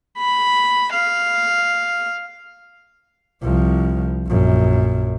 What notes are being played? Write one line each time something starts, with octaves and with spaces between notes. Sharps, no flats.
B5
F5
C2 F3
A#1 F#2